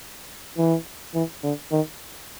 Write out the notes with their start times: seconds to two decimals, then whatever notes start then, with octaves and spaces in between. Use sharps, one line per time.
0.58 E3
1.15 E3
1.43 D3
1.72 D#3